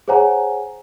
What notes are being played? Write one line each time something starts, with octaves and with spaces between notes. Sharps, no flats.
G#4 C5 C#5 F#5 G#5 A#5